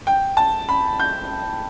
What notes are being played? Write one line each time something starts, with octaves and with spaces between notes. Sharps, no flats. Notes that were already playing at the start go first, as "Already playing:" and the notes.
G5
A5
B5
G6